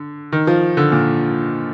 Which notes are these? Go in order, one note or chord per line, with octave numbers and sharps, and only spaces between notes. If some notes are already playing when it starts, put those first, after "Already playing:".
Already playing: D3
D#3
F3
D3
A#2